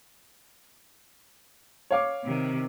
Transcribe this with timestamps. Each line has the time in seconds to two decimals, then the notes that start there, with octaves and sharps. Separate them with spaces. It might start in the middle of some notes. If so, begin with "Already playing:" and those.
1.91 C#5 F5 D6
2.24 C3 D#3